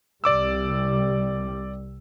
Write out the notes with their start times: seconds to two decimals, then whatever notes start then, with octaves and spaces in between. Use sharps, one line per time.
0.24 C2 G3 D5 D6 E6